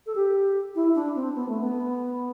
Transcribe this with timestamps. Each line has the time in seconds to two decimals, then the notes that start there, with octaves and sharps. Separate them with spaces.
0.07 A4
0.15 G4
0.75 E4
0.95 D4
1.15 C4
1.35 B3
1.48 A3
1.61 B3